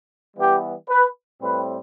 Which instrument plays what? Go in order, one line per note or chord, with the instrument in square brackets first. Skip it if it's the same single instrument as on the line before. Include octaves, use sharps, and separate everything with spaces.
[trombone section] E3 G3 B3 G4
B4
A2 G3 C4 B4